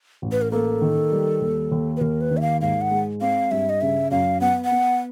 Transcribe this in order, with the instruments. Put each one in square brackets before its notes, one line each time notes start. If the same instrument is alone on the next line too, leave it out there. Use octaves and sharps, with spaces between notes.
[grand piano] A1
[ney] B4
A#4
[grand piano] A#3 [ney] A4
[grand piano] D#3
G3
D#2
D#2
[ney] B4
[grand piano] D#2 [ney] A#4
[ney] B4
[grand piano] D#3
[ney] E5
F5
[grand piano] G#2 [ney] F5
[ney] F#5
[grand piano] G#3
[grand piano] C4 [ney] F5
[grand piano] G2 [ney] E5
[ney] D#5
[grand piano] C#3 [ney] E5
[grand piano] F#2 [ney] F5
[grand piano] B3 [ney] F#5
[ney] F#5
[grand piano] B3